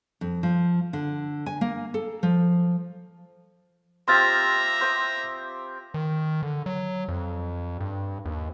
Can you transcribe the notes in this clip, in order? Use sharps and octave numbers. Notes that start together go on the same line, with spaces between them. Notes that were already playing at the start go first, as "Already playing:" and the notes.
F2
F3
D3
G#5
A#3
A4
F3
C4 F4 G4 E5 A#5 C6 F6 A6
C5 G5 D#6
D#3
D3
F#3
F2
G2
D#2